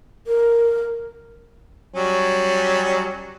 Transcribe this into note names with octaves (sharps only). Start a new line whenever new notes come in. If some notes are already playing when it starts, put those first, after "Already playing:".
A#4
F#3 G3 C#4